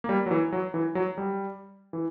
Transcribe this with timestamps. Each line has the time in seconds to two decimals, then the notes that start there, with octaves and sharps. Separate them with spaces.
0.04 A#3
0.09 G3
0.26 F#3
0.31 E3
0.52 F#3
0.74 E3
0.95 F#3
1.18 G3
1.93 E3